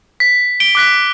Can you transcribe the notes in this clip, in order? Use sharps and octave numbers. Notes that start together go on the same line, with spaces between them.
B6
D7 G7
D6 F#6 B6